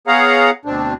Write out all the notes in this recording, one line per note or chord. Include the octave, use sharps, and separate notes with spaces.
B3 G#4 C#5 F5 F#5 A#5
D2 B2 C4 D4